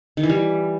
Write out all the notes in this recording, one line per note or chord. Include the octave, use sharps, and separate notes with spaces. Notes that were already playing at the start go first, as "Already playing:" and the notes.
D#3
E3
G3